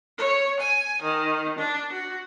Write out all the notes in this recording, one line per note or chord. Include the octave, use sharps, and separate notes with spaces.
C#5
G#5
D#3
D4
F#4